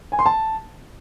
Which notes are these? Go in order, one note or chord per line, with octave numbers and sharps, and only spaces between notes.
G#5
C6
A5